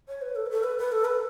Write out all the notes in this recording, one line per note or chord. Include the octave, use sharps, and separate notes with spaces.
C#5
B4
A4
B4
A4
B4
B4
A4
B4